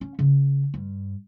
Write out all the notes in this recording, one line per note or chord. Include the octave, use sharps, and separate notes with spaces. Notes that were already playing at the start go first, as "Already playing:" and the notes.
C#4
C#3
G2